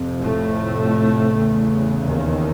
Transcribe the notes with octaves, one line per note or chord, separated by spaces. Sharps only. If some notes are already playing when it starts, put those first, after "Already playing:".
Already playing: F2 C3
A2 A3
E2 C#3
D#2 D#3